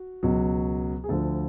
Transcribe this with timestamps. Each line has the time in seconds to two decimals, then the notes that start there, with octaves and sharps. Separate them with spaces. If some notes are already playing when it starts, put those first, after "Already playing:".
Already playing: F#4
0.23 C#2 B2 F#3
1.04 G#4
1.09 D2 D3 F3 A4